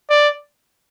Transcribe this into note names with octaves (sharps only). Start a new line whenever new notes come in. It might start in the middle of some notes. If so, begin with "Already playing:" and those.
D5